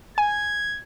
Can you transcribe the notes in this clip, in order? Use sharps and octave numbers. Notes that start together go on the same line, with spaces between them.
G#5 G#6